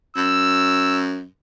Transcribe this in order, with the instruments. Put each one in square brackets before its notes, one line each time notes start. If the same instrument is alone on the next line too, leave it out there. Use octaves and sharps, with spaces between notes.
[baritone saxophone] F#2 [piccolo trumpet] E6